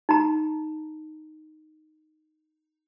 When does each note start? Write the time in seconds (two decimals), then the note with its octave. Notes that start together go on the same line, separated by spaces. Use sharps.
0.09 D#4 A#5